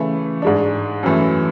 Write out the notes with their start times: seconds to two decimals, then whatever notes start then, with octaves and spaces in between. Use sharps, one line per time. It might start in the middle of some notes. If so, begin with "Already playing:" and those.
Already playing: C#3 E3 A3
0.42 G#2 G#3 D4
1.03 F#2 E3 A3